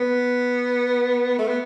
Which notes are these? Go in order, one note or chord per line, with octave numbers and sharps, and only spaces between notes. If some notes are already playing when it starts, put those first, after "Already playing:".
Already playing: B3
A3
B3